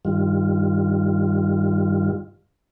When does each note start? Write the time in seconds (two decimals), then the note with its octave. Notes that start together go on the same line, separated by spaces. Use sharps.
0.05 G2 D#3 G3 F4